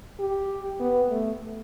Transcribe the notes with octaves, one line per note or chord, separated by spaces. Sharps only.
G4
B3
A3